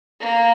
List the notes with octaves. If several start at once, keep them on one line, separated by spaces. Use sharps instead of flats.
A#3